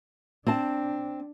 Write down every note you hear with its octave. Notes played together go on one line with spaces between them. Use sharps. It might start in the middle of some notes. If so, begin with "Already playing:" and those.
C4 D4 A5